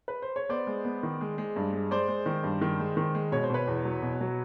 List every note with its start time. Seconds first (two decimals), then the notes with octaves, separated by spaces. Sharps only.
0.08 B4
0.22 C5
0.36 C#5
0.49 B3 C5 D5
0.67 G#3
0.85 B3
1.03 D#3
1.21 G#3
1.38 G#3
1.56 G2
1.73 G#3
1.91 G#3 C5 D5
2.08 G#3
2.26 D#3
2.44 G2
2.61 D#3
2.80 G#3
2.97 D#3
3.15 G#3
3.32 B2 C#5
3.44 C5
3.50 B2 B4 C#5
3.67 E2
3.85 F#3
4.03 B2
4.21 F#3